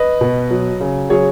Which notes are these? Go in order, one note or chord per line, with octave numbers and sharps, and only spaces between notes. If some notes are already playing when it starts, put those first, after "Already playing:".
Already playing: B4 D#5
B2
F#3
C#3
F#3 G#4 C#5